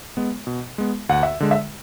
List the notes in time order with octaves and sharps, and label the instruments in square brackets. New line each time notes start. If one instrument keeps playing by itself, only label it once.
[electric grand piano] G#3 B3
B2
G#3 B3
[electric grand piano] D2 [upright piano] F#5
[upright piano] E5
[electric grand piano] D3 G#3
[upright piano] E5